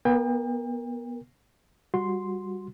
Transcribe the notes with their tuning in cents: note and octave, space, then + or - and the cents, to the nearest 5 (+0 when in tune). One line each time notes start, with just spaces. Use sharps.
B3 -25 A#4 +0 G5 +40
G3 +0 F#4 -20 C6 +0